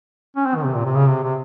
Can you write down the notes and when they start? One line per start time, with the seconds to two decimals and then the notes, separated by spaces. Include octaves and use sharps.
0.36 C#4
0.46 C4
0.55 D#3
0.64 C3
0.74 A#2
0.85 C3
0.95 C#3
1.08 C3
1.23 C3